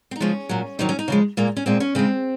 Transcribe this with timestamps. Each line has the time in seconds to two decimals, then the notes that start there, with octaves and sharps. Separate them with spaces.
0.11 C4
0.16 D#4
0.20 C#3 F3 G#3 C#4
0.49 A#2 F#3
0.79 C3 D#3 F#3 D#4
0.89 C#4
0.99 D#4
1.08 C#3 F3 G#3
1.37 A#2 G#3 A#3
1.57 C#4
1.66 A#2 G#3 C4
1.80 C#4
1.95 C#3 G#3 C4